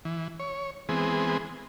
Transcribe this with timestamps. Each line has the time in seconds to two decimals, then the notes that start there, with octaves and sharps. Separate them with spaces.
0.05 E3
0.40 C#5
0.89 E3 G#3 B3 C4 G#4